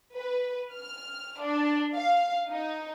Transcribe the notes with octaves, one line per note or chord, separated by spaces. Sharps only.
B4
F6
D4
F5
D#4